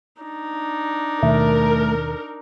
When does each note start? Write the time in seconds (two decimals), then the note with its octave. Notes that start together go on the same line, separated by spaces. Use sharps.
0.22 D4 D#4
1.23 D#2 B2 D#3 A3 A#4